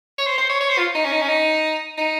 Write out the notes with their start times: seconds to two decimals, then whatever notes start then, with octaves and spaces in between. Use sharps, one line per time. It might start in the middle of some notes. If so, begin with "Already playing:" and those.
0.18 C#5
0.27 C5
0.38 C5
0.50 C#5
0.61 C#5
0.70 C5
0.78 F4
0.95 D#4
1.04 C#4
1.12 D#4
1.21 C#4
1.29 D#4
1.98 D#4